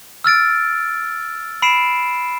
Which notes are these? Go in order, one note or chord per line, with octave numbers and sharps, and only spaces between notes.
E6 F6 A6 D7
B5 C7 D7 E7